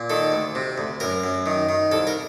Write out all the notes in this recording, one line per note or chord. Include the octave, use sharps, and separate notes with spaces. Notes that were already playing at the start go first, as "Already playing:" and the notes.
Already playing: A#2
D#3 A4
D2
C3
D2
F#2 A#4
F#2
D#3
D#3
C2 A4
A#4